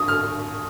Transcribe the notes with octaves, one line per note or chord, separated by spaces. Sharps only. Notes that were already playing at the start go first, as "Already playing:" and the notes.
Already playing: G2 D#6
F6